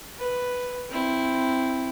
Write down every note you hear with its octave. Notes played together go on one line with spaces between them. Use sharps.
B4
C4 E4